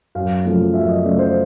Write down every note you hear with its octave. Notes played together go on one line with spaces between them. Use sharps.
F#2 F5
C#3 F3 A3
F#2 E5
D#5
C#3 F3 A3 D5
C5